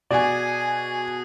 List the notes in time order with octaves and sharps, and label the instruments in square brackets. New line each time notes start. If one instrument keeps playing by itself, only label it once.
[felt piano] B2 F#4 G#5 [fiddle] G#4 [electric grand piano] D5